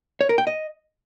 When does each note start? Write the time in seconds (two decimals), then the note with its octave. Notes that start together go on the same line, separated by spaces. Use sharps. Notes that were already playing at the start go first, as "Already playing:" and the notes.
0.21 C#5
0.29 A#4
0.38 G5
0.47 D#5